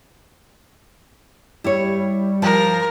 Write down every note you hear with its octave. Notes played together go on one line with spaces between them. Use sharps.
G3 E4 C#5
F3 A#4